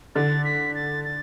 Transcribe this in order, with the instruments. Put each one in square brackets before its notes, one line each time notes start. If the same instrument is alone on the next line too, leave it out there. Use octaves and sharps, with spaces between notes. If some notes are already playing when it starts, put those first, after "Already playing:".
[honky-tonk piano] D3 [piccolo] A6
[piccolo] B6
A6
A6